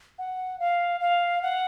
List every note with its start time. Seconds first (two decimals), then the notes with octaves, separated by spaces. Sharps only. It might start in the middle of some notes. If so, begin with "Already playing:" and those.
0.18 F#5
0.59 F5
1.00 F5
1.42 F#5